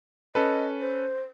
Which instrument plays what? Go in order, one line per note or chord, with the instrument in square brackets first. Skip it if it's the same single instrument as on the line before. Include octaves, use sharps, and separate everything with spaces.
[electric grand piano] C#4 A4 B4 [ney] D#5
[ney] C5